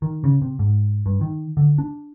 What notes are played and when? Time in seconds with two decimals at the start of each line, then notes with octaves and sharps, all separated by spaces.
0.02 D#3
0.24 C#3
0.42 C3
0.59 G#2
1.06 G2
1.21 D#3
1.57 D3
1.78 D4